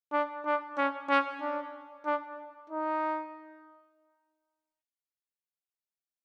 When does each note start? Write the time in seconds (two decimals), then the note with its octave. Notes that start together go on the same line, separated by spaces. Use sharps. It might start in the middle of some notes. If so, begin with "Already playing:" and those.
0.12 D4
0.45 D4
0.78 C#4
1.09 C#4
1.41 D4
2.06 D4
2.70 D#4